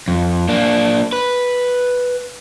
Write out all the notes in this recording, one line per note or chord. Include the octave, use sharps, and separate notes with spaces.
F2
A#3 D4
B4